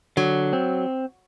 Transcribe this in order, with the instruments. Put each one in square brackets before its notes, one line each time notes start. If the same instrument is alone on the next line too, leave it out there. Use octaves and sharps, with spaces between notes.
[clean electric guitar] D3 [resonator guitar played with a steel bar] F#3
[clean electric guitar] C4